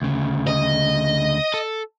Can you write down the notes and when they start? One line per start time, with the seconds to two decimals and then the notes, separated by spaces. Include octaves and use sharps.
0.02 D2 C#3
0.47 D#5
1.54 A4